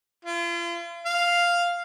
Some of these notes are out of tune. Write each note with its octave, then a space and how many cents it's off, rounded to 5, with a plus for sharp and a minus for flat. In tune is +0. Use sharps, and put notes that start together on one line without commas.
F4 -40
F5 +0